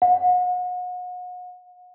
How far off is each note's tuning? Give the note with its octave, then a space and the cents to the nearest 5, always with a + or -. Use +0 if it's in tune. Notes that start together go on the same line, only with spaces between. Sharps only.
F#5 -40